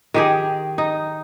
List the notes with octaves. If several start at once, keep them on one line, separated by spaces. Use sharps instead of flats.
D#3 G4 G#4
D#4